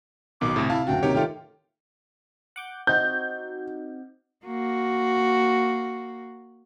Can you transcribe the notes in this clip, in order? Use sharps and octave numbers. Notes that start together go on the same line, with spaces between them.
B1 B2 D#3 D6
D2 A2 C3
E4 F5 A5
F#1 D2 F#4 G5
C3 D#3 A#3 G4 C#5
D#3 A3 F4 G5
F#5 D6 G6
C4 D#4 F#4 G6
A#3 F#4